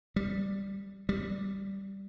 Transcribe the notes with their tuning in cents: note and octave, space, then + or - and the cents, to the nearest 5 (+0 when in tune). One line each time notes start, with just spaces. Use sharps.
G3 +5
G3 -5